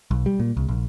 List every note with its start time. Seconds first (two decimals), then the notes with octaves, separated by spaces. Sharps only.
0.11 B1
0.26 G3
0.40 A#2
0.57 C2
0.69 A#1